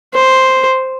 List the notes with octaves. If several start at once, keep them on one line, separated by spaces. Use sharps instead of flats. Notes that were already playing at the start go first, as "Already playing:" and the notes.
C5